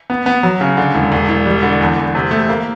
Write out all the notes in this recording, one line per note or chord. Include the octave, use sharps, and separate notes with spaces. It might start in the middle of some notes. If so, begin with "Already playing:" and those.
B3
B3
F#3
C#3
D3
E1
E1
E1
G3
D3
E2
E2
C3
A3
A#3